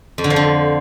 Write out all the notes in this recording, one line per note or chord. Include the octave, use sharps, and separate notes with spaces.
F2
D3
F3
D3